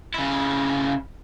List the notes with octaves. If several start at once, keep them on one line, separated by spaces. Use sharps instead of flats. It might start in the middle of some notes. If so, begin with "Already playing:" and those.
C#3 E4